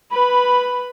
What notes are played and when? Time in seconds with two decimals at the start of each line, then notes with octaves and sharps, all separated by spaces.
0.11 B4 B5